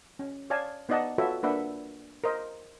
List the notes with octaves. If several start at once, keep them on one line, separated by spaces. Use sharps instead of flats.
C#4
C#5 D5 F5 G#5 A5
B3 D#4 D5 D#5 F#5 A5
F4 F#4 A4 B4 C#5 E5
A#3 D4 B4 E5 F#5
A#4 C5 D#5